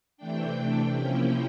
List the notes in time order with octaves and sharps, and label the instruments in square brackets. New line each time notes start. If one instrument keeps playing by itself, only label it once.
[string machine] C3 E3 A3 D4 G5
C3 F3 A#3 C#4 E4